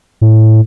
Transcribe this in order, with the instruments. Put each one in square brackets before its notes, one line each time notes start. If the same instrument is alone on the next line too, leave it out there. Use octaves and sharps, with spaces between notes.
[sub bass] A2